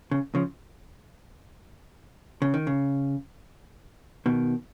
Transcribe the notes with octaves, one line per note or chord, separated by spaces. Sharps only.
C#3
C#3 F3
C#3
D#3
C#3
B2 D#3